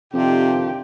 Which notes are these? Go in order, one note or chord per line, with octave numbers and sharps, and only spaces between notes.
F2 C3 D#3 D4 F4 G4